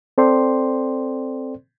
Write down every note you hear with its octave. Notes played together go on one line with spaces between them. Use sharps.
C4 A4 C5 D5 G5 C6